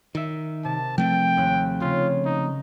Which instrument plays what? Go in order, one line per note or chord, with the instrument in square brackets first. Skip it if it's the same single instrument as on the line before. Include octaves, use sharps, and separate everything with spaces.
[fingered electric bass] D#3 [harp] A#4 E5
[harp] C3 [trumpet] A5
[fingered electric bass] F3 A3 C4 [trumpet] G5
[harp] D#2 G#3 F#6
[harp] C#3 C#4 [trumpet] F4
[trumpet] D#4